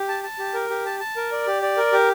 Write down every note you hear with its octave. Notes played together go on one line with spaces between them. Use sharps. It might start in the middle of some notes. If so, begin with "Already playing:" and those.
Already playing: G4
A5
A5
G4
A#4
G4
A5
A5
A#4
D5
G4
D5
A#4
G4